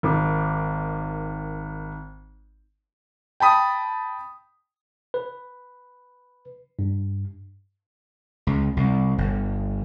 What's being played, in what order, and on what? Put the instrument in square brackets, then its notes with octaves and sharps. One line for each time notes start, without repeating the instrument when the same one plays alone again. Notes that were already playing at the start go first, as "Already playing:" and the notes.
[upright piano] G#1 D#3 D6
[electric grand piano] G5 A5 B5 D#6
[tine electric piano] B4
G2
[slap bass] C#2
C2
G1